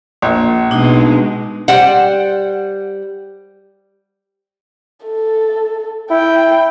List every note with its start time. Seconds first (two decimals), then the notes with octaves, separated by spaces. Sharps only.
0.22 A#1
0.71 B2 G#3 D4 D#4
1.68 G3 C5 F#5 G5
5.06 A4
6.11 E4 G5